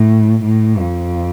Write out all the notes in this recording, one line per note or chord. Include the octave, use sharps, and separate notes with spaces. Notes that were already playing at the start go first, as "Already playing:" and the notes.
Already playing: A2
A2
F2